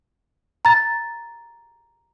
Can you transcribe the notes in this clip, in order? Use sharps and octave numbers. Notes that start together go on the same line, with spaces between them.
A#5 A6